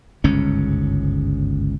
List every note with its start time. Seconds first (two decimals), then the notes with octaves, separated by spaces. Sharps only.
0.24 G1 C#2 G#2 C#4